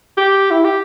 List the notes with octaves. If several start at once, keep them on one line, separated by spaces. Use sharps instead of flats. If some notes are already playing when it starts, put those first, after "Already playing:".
G4
E4
G4